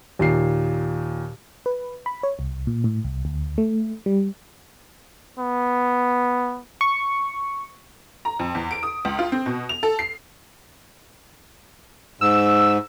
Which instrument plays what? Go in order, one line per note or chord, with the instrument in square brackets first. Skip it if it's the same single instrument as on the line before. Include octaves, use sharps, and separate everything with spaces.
[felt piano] D#2 A#2 C7
[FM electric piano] B4
B5
C#5
C2
A#2
A2
C2
D2
A3
G3
[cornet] B3
[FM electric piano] C#6
[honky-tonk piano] A#5
F2
E2
D7
D#6
C#2
F4
C4
B2
F7
A4
C7
[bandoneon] G#2 [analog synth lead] E6